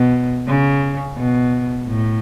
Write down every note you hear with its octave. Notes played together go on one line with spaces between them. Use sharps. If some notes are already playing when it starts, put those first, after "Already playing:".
Already playing: B2
C#3
B2
A2